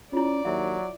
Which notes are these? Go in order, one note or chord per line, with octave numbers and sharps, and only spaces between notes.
C#4 E4 F4 D5
D#2 F#3 E5